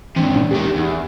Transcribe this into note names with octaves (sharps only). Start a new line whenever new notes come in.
G#2 C3 E3 D4
A#2 C#4 D4
E2 D#3 G4
E2
E5